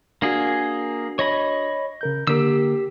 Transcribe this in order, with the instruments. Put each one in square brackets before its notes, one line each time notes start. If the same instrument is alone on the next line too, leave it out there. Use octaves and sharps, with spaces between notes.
[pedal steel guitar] A#3 G#4 [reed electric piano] D4 F#4
[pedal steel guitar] C#5 D#5 B5
[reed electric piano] C#3 A#4 G6
[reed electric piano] D3 A#3 A#4 [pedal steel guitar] G4 E6